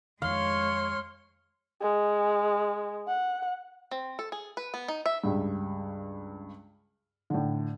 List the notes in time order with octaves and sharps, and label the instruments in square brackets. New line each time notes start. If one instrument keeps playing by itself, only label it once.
[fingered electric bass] F2 D#3 [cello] G#3 C#5 [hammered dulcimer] F5 [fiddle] C6
[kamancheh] G#3
F#5
[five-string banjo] C4
A4
G#4
B4
B3
D#4
E5
[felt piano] C#2 G2
A2 D3